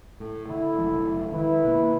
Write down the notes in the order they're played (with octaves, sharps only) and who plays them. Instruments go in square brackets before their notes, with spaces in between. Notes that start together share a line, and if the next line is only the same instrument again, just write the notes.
[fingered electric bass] A2 [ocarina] A4
[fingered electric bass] D3 [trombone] E4 [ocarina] A4
[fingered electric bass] F1 F3 G#3
[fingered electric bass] D#3 [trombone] E4 [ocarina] B4
[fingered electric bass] B2 A#3